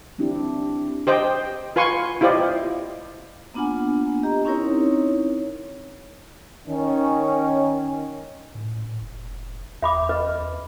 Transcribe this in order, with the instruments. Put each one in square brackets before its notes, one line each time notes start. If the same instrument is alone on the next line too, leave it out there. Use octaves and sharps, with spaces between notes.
[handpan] C4 D4 E4 G4
[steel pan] G4 C5 D#5 G5
F4 B4 G#5 C6 C#6
E4 F4 G4 C5 D5 D#5
[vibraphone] A#3 B3 D4 F4 F#5 G#5
G4 D#5 A#5
C4 C#4 D#4 E4 A#4 C#5
[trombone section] D#3 C#4
[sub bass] A2
F1
[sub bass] E2 [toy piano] E5 B5 D6
[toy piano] B4 D#5